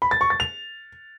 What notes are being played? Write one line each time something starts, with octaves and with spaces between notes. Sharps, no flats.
B5
A6
C#6
A6
F7